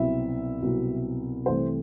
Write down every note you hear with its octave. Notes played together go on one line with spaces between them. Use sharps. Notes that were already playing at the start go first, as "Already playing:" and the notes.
Already playing: C2 B2 F#3 C4 E4 E5
C2 B2 F#3 C4 E4
C2 C3 E3 A3 C4 C5